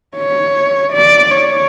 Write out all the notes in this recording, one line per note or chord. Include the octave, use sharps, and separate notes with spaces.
C#5
D5
C#5